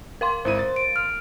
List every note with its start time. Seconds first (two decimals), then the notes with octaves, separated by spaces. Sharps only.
0.21 A#4 F5 C6
0.45 G#1 E4 C5 D#7
0.59 A6
0.76 D7
0.96 F6